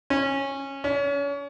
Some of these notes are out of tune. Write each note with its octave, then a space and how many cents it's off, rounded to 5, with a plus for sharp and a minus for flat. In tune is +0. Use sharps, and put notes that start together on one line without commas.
C#4 -15
C#4 +35